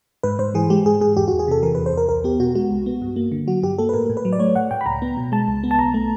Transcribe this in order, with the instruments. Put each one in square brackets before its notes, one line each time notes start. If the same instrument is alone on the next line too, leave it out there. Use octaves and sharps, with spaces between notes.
[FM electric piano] G#2 B4
G#2 C5
E3 G#4
G#3 G4
G#2 G#4
G#2 G#4
E2 G4
F#4
E2
G#4
C3 A4
E3 A#4
B4
E2
C5
E2 A#4
C2 A#4
B3 G4
B2 F#4
G#3 F#4
C2
B3
G2
A#3
D3
F#3 F#4
G2 G4
A#3 A4
B4
A2 A#4
A2
B4
F#3
D5
A3 C#5
A2 F#5
A2 G5
B5
C#2 A#5
B3
B2
G#3 A5
C#2
B3
A5
B1 A#5
A3